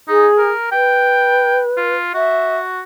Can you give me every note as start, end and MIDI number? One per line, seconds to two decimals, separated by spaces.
0.08 0.27 63
0.08 0.48 68
0.38 0.68 70
0.72 1.95 71
0.72 1.61 79
1.77 2.12 65
2.14 2.81 66
2.14 2.57 76